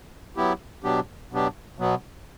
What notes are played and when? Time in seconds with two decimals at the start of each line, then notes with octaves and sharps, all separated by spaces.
0.36 F#3 B3 E4 G4
0.84 B2 F#3 B3 D4 G4
1.31 B2 F#3 B3 D4 G4
1.78 B2 F#3 B3